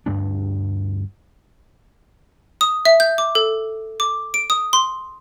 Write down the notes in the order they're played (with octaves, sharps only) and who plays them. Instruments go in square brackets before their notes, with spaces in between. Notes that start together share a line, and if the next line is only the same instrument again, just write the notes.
[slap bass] D2 G2 A3 D4
[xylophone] D#6
E5
G6
D6
A4
D6
D7
D#6
C6